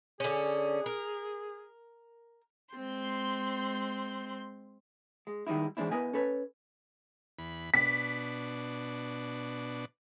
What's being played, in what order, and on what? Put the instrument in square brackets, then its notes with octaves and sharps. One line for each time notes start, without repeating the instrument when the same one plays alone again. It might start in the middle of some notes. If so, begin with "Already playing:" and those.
[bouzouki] D3 C#4 [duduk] G#4
[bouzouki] A#4
[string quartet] G#3 C4 C6 G6
[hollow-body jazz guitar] G#3
D#3 G3 G#3 D#4 E4
G#2 E3 G#3 C4 D4 E4
B3 E4 A#4 B4 D#5 G#5
C#4 A4 B4 C#5
[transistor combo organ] E2 B5
[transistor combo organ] B2 D4 [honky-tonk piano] B6